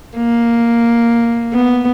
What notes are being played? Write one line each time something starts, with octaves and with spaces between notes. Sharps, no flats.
A#3
B3